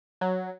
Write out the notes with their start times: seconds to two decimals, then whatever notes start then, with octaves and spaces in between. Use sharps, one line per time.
0.21 F#3